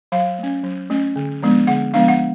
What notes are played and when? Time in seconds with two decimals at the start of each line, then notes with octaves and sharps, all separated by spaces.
0.12 F#3 F5
0.39 A3 C#4
0.64 F#3
0.90 A3 C#4
1.16 D3
1.43 F3 G#3 B3 D4
1.67 D3 F#5
1.94 F3 G#3 B3 D4 F5
2.08 F#5